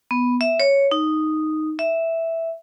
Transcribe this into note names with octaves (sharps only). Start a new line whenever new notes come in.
B3
E5
C#5
D#4
E5